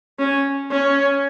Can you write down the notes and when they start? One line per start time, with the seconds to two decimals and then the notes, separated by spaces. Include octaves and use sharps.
0.19 C#4
0.72 C#4